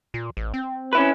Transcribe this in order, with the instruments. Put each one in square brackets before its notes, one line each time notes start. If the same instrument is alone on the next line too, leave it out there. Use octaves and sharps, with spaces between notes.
[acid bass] A#2
A1
C4
[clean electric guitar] C#4 E4 B4